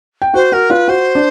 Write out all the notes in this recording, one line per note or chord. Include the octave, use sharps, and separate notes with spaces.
G5
F#4 C5 F#5
F#4 A#4 F#5
F4 B4 F5
F#4 C5 F#5
D4 D5